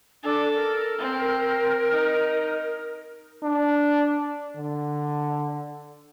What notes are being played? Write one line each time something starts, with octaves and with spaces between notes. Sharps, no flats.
D4 A4
A#4
C4
D#4
D4
D3